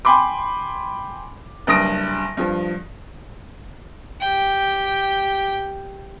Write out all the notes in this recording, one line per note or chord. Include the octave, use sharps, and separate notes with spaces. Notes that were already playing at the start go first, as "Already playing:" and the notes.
G5 G#5 B5 C6 D6
F#1 G2 D#6 A#6 D7
G2 F3
G4 G5